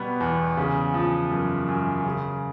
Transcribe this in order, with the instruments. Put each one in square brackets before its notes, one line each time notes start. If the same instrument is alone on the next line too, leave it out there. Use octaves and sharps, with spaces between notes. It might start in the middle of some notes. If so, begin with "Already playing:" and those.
Already playing: [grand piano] B2 G3 B3
E2
C#3
F3
F#2
F#2
C#3